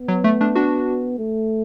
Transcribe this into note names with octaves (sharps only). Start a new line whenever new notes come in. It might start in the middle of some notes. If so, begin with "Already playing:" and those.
Already playing: B3
F#3
A3
A3 D4
D4 F#4
A3